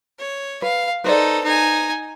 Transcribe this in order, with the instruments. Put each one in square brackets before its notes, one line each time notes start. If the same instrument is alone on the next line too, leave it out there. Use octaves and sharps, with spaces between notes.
[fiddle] C#5
[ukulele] B4 [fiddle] F5
[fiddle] D#4 A4 [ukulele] B4 C5 D5
[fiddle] D#4 G#5